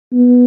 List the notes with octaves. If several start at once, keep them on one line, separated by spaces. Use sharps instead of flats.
B3